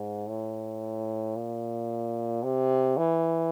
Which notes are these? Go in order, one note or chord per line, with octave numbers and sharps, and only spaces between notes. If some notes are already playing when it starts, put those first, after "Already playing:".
Already playing: G#2
A2
A#2
C3
E3